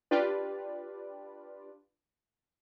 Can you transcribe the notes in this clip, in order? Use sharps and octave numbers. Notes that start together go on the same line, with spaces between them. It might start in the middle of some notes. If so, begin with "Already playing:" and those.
D4 F4 G4 B4 D5